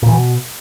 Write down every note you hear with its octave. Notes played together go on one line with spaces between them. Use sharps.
A#2
E3
B2